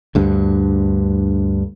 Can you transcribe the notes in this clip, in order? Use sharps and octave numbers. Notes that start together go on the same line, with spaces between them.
D2 G2 D3